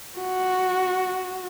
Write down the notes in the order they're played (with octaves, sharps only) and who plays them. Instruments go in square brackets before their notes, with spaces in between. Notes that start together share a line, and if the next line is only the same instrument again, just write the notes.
[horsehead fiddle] F#4